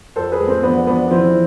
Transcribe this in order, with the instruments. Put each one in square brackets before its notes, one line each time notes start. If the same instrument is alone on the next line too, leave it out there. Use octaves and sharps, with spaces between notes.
[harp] F2 [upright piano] A4 C5
[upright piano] G#4 B4
[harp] G#3
[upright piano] A3 C4
[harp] F3 [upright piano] B3 D4
[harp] G#3 [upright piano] B3 D4
[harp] F3 [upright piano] C4 E4